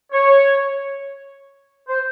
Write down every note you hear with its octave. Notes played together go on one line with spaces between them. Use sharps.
C#5
C5